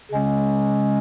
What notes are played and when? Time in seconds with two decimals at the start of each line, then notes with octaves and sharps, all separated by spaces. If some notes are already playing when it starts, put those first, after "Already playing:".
0.12 C#3 G#3 C#4